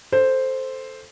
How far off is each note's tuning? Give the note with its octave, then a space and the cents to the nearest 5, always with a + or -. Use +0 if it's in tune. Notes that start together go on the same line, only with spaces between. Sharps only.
A4 +0 C5 +0